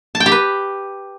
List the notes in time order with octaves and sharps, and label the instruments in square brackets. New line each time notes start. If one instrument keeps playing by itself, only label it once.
[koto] A5
G5
G4
B4